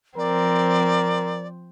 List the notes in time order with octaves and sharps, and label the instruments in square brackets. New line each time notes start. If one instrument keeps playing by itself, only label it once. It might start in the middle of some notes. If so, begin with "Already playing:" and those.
[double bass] F3 [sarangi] C4 [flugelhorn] A#4 [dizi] D5